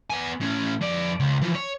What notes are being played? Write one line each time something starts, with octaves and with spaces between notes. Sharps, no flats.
B3 G#5
A2 C#4
F2 D5
C#2
E3 F3
C#5